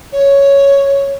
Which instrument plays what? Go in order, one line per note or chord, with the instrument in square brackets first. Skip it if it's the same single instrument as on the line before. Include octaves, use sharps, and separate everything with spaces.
[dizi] C#5